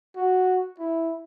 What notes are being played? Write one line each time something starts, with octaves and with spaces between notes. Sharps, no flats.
F#4
E4